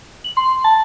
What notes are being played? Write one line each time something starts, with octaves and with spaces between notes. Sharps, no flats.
F#7
C6
A5